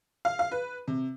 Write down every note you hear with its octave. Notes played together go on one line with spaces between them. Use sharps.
F5
F5
B4
C3